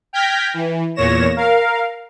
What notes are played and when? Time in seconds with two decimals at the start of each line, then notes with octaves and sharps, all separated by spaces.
0.13 G5 F6 G6 G#6 A#6 B6
0.54 E3
0.95 E2 A#2 C#5 A#6 E7
1.37 A#4 F5